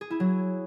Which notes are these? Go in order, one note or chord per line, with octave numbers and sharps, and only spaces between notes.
G#4
E4
F#3